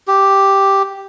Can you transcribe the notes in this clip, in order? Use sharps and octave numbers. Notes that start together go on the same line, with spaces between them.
G4